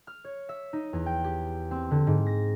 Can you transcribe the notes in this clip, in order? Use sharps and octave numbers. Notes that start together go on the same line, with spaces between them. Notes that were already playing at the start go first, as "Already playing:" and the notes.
F6
C#5
E5
D#4
E2
G5
G4
C4
D3
G#2
A#6